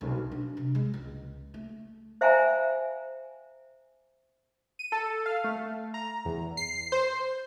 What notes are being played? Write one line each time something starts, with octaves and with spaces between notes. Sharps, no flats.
B1
D4
C3
G#3
C#2
A3
C5 E5 F5 G5 G#5 A#5
D#7
A4
F5
A3
A#5
E2
C7
C5